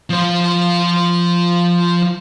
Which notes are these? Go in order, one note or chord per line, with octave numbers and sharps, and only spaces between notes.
F3 C5